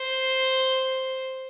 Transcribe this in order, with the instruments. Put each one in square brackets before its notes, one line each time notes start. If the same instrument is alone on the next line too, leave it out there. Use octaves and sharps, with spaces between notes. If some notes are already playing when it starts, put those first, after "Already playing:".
Already playing: [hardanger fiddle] C5